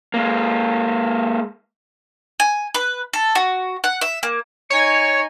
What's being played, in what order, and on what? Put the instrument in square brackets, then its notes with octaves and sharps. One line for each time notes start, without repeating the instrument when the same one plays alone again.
[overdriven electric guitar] G#3 A#3
[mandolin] G#5
B4
A4
F#4
F#5
E5
A#3
[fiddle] D#4 G#5 [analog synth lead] C#5 [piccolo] C#7